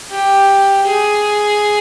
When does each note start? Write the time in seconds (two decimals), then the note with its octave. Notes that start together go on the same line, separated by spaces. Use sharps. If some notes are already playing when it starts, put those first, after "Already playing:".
0.11 G4
0.87 G#4